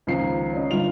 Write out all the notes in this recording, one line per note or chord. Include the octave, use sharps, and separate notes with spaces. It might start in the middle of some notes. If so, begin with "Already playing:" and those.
C#2 D#3 F3 C7
C#4 D#4
G1 G2 F4 F7